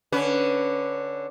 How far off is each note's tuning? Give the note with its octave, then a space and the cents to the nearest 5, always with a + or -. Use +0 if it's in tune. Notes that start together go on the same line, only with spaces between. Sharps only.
D3 +5 C#4 +10 B4 +0